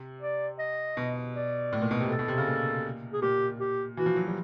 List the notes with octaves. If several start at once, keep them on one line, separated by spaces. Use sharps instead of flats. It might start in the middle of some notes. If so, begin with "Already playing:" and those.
Already playing: C3
D5
D#5
B2
D5
A2
A#2
B2
C3
A4
B2
C3
C#3
A#2
G#4
A#2 G4
G4
E3 F#4
F3
F#3
G3